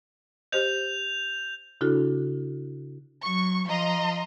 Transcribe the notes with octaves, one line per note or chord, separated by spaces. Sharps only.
G4 C5 D#5 G6 F7
C#3 D4 E4 F#4 A4
F#3 C#6
F3 D#5 A#5 C6